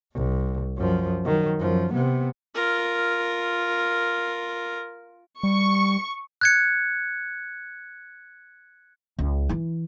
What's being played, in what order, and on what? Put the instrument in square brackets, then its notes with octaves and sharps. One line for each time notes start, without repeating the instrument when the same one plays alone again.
[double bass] C2
F#2 F3
D#3 F#3
F#2 F3
C3 B3
[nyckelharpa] F4 A#4
[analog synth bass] G3 [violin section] C#6
[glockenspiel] F#6 G#6 C#7
[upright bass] C#2
E3 E4